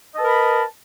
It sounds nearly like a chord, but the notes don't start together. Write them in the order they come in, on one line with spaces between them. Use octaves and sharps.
D#5 A5 B4 A#4 B5